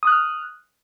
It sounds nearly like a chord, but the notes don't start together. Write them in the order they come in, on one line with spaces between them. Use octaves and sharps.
D#6 F#6 F6